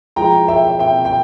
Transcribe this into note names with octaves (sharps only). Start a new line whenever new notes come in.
F3 G#3 E4 G5 A#5
E5 G5
E5 G5
G5